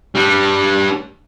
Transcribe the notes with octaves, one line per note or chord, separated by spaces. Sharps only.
G3 D4